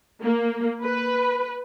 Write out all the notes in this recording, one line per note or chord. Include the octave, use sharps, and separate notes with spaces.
A#3
B4